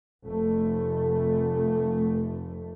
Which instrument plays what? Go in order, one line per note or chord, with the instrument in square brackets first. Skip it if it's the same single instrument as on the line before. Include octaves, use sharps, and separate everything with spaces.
[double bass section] F1 A3